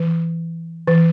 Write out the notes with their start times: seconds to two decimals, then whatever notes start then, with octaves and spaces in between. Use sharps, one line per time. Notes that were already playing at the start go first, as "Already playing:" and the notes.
Already playing: E3
0.88 E3